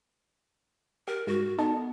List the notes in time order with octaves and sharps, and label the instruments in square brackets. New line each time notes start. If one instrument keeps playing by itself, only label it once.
[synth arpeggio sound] G4 [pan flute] A#4
[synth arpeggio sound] G#2 [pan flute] F#4
[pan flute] B3 [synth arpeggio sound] D#4 A4 A5